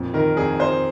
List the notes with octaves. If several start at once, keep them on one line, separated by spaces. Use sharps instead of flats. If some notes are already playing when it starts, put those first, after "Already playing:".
Already playing: F2 A#2
D#3 A#4
F2 G#4
F2 C5